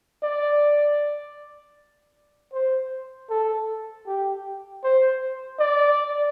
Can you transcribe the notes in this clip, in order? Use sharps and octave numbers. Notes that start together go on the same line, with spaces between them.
D5
C5
A4
G4
C5
D5